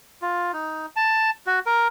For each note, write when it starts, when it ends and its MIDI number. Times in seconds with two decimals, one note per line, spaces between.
0.22 0.52 65
0.53 0.86 63
0.96 1.30 81
1.46 1.59 66
1.66 1.88 70